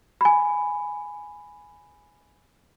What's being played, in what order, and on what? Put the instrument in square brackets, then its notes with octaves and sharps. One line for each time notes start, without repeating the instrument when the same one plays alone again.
[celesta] G#5 B5